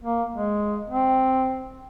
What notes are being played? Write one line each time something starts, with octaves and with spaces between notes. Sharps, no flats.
A#3
G#3
C4